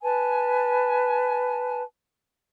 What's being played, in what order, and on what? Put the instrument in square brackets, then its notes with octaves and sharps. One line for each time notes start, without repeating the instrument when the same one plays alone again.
[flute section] B4 G#5 A5